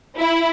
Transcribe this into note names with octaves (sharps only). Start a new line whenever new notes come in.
E4